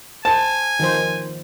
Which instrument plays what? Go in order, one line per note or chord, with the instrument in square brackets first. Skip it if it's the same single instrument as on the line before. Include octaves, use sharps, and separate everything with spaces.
[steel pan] C5 [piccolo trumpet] G#5 [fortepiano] A5
[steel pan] D#3 F3 C5